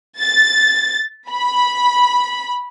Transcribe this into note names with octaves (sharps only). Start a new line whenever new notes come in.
A6
B5